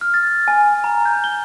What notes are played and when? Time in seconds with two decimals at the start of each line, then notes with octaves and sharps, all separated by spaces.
0.01 F6
0.14 A6
0.48 G#5
0.84 A#5
1.05 G6
1.24 G7